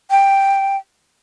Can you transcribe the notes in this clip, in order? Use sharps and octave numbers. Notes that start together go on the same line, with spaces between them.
G5